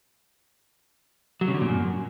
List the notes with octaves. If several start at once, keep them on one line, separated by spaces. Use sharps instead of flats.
F#3
C#3
D3
A#2
F#2